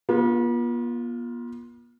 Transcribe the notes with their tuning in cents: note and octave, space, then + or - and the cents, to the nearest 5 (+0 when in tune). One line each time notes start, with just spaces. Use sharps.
B3 -45 F4 +0